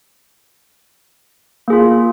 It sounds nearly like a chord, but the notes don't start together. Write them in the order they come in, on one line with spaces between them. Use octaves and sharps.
A#3 G#4 F4